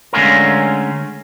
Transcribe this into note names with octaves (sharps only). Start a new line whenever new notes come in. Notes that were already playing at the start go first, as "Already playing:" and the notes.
D3 G#3 A3 C#4 F4 A#4